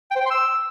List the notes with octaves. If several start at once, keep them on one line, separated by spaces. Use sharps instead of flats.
G5
C5
G5
C6
E6